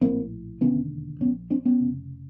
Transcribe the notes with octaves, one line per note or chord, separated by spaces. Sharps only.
A#1 A2 A#3 C4
E1 D#2 D3 B3 C#4
A#2 B3 C#4
A#1
C4 D4
B3 C#4
F1 F2 C#3